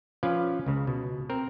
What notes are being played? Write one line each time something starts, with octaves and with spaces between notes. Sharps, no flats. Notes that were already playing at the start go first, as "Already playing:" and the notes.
F3 C#4 F4 B4 D5 F5
C#2 C#3
B2
C4 A#4